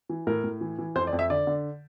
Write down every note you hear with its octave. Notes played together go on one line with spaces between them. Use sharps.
E3
A2 A#4
A2
E3
E3
F2 C5
D5
F2
E5
D3 D5
D3